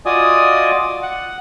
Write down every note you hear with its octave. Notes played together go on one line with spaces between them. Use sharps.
F4 F#4 D5 D#5 G#5 D#6
F#5